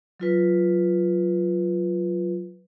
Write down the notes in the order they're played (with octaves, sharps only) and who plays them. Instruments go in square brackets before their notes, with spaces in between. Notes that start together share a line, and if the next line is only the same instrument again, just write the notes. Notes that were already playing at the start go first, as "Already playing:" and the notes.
[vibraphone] F#3 F4 B4